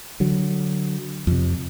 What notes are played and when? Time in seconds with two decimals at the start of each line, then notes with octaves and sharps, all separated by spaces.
0.20 D3 F#3
1.27 F2 C3